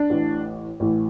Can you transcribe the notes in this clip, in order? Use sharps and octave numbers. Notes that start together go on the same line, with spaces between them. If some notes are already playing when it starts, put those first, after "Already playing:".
Already playing: D4
A1 A2 E3
A1 A2 E3